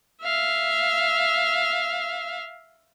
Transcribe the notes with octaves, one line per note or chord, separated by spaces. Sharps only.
E5 F5